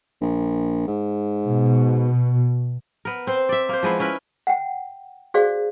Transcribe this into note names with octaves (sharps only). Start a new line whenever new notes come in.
A#1
G#2
B2
B3 A#4
C4 C5
D5 E5
A#3 C5
F3 G#3 B3 E4
C#4 E4 A#4 B4
F#5 G5
F#4 G#4 C5 D5 F5